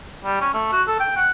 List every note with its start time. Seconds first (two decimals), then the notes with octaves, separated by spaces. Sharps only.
0.24 G3
0.41 C#4
0.54 A3
0.72 F#4
0.87 A4
1.00 G5
1.16 F#5